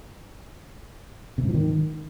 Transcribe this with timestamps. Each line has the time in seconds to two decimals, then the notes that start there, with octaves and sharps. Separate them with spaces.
1.38 C3
1.43 G#2
1.49 F3
1.54 D#3